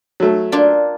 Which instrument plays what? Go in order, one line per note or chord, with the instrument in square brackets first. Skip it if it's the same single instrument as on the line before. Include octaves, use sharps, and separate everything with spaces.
[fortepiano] F#3 A3
[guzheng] A#3 D4 F4